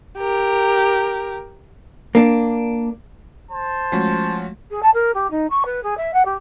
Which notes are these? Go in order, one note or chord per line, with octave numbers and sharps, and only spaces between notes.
G4 A#4
A#3 D4
C5 A5
F3 G#3 A3 C#4 F#4
G#4
A5
A#4
G4
D#4
C#6
B4
G#4
E5
F#5
G4